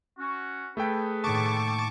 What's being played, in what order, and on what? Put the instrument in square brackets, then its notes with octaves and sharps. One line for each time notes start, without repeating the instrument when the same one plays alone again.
[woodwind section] C#4 F#4
[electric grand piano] A3 A4 G5 [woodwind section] G#4 B4
[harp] A2 D#3 A#3 [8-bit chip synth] A5 C#6 D6